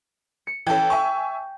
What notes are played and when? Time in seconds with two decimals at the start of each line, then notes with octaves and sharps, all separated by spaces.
0.47 C#7
0.67 E3 C#4 A4 G5
0.90 E5 G#5 C#6